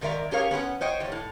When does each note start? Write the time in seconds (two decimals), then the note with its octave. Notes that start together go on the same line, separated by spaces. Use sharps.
0.01 G#2 D#3 A#4 D5 E5 A#5
0.31 C#4 G4 G#4 A#4 C#5 F5
0.51 B3 C#4 A#4 F#5
0.81 C5 C#5 D#5 G5
1.00 E2 G3
1.12 A2